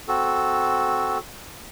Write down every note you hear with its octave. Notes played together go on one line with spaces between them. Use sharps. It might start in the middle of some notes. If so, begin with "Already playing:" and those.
C4 F#4 A4